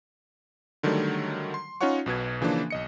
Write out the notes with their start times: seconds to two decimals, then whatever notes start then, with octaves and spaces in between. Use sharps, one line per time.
0.83 D3 D#3 F#3 G3 A3
1.54 C6
1.81 C#4 D#4 F4 C#5 F#5 C#6
2.06 B1 B2 B4 G#6
2.41 C#3 E3 F3 A#3 D4
2.70 B1 D#5 C#7